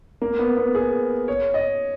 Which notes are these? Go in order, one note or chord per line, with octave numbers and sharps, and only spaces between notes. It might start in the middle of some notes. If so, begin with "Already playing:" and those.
A#3
B3
B3
G#4
C#5
D#5